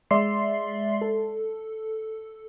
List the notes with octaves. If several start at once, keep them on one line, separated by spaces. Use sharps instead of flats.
G#3 D5 E5 C6 C7
A4